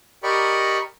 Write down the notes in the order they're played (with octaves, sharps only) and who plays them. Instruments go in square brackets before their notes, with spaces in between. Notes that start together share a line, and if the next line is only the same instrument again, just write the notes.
[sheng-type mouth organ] G4 A#4 D5 D#5 B5 C#6